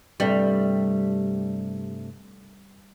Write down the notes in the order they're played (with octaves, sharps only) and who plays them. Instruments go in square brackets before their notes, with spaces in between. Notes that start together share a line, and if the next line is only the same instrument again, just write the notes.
[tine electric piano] G2 C3 A3 [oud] G3